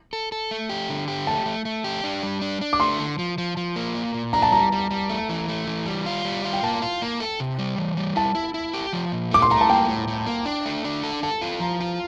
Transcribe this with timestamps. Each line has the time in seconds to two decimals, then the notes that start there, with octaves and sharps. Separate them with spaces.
0.13 A4
0.32 A4
0.51 A3
0.69 G4
0.90 D3
1.08 G4
1.27 A3 A5
1.46 A3
1.65 A3
1.84 G4
2.04 D4
2.23 G3
2.41 D4
2.61 D4
2.73 D6
2.80 A3 C6
2.99 D3
3.19 F3
3.38 F3
3.57 F3
3.76 A#3
3.95 A#2
4.14 A#2
4.33 D4 A#5
4.42 A5
4.52 G3 A#5
4.72 G3
4.91 G3
5.09 A3
5.29 E3
5.48 A3
5.67 E3
5.86 G3
6.06 F4
6.25 G3
6.44 F4
6.53 G5
6.63 A#3 A5
6.82 F4
7.02 A#3
7.20 A4
7.40 C3
7.59 G3
7.78 E3
7.97 G3
8.16 E4 A5
8.35 E4
8.54 E4
8.73 G4
8.93 F3
9.12 A#2
9.31 A3 D6
9.42 C6
9.50 A3 A#5
9.61 A5
9.69 A#3 G5
9.89 A2
10.08 A2
10.27 A#3
10.46 D4
10.65 A3
10.85 D4
11.04 A4
11.23 A4 A5
11.41 F4
11.60 F3 A#5
11.80 F4